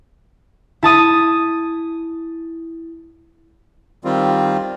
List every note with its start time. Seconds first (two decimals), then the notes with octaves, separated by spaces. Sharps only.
0.83 E4 A5 D#6 D#7
4.05 D#3 G3 C4 F4